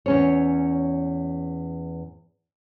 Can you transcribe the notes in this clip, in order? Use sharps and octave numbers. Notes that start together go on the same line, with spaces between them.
E2 C#4 C#5